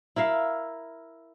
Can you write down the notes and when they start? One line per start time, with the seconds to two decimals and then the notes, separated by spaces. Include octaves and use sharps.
0.16 E4 A#4 E5 F5